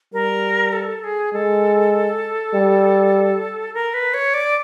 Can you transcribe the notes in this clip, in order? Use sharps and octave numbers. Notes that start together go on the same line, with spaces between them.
G3 A#4
A4
G#4
G#3 A4
G3
A#4
B4
C#5
D5